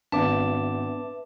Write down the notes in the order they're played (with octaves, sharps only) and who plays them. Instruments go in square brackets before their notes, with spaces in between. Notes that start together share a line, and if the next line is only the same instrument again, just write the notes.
[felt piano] G#1 [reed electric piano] B3 D4 [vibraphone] B4 E5 [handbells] A5 D6